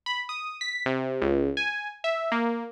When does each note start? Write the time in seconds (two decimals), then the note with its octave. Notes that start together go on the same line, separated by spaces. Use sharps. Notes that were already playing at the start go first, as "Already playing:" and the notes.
0.06 B5
0.29 D#6
0.61 B6
0.86 C3
1.22 C#2
1.57 G#5
2.04 E5
2.32 A#3